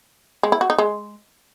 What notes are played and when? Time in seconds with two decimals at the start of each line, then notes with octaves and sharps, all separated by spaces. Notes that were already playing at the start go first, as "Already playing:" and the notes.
0.43 G#3
0.52 E4
0.61 F#4
0.70 D#4
0.78 G#3